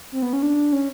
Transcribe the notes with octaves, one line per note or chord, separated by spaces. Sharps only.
C4
B3
C#4
D4
C#4